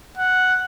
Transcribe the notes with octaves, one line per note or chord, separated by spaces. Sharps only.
F#5